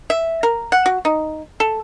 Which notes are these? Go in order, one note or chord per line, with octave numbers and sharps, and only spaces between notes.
E5
A#4
F#5
F#4
D#4
A4